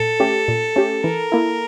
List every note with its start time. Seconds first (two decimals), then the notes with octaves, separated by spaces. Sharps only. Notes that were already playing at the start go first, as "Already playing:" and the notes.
Already playing: A#2 A4
0.20 A3 C#4 G4
0.48 A#2
0.76 A3 C#4 G4
1.04 E3 A#4
1.32 A#3 E4